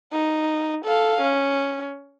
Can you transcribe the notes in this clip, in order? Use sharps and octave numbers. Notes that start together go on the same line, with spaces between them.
D#4
A4 F5
C#4